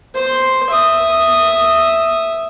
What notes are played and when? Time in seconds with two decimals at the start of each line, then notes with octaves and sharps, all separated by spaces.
0.15 C5 C6
0.71 E5 D#6